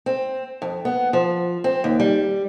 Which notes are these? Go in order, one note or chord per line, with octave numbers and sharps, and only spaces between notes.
C4
F2
B3
F3
C4
D#2
G3